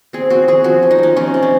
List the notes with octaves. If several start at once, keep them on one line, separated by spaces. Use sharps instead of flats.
C4 G#4
C4 F#4
C4 G#4
F3 F#4
F3
D#4
F3 C#4
C3 C#4
C3
C#4